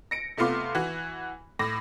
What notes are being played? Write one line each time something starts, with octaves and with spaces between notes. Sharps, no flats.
A#6 C#7 D7
C3 A3 B3 F4 C6 D6
E3 F#4
A2 D6 A#6